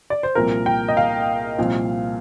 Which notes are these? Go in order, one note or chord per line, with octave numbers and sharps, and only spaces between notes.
D5
C5
C2 A#2 F3 A#4
G5
D#5
F5
C2 A#2 F3